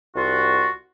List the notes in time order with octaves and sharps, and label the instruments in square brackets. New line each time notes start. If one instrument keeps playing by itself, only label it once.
[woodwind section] C2 F4 F#4